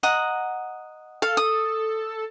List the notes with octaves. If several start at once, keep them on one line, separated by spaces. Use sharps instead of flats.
D#5 F#5 A#5
A4 F5
D#6